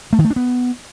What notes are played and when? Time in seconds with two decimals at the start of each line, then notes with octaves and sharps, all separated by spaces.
0.13 A3
0.19 D#3
0.24 A3
0.30 D4
0.36 B3